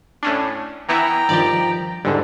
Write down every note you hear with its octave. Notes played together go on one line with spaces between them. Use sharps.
A2 C#4 D4
E3 B3 E4 G5 A#5
G2 D#3 F3 G4 D5
E2 G#2 D3 G3 A4